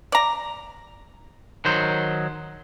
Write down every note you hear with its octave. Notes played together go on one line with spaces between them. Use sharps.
D5 A#5
D#3 F#3 C5